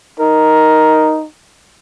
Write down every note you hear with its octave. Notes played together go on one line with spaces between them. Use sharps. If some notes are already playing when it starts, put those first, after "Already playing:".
D#4 A#4